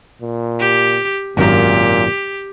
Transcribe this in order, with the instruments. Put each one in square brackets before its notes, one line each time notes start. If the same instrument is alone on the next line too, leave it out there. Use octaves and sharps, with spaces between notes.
[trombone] A#2
[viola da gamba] G4
[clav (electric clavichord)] G#1 F#2 A#5 [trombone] A#2 [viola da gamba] G4